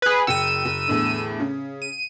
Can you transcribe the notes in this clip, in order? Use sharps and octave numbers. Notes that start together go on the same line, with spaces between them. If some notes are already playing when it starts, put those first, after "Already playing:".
G#4 B4
F#1 G5 E6 C#7 D#7
F#1
E2 A2 D3
C#3
D#7